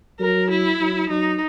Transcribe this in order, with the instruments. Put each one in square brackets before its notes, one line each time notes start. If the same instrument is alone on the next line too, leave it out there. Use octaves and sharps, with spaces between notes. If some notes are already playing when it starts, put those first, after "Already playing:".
[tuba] F#3 [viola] A#4
[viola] E4
[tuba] F#3
[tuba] F#3 [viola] D#4